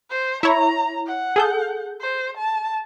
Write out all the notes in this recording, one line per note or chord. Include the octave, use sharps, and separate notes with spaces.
C5
E4 C#5 A#5
F#5
G#4 A4 G6
C5
A5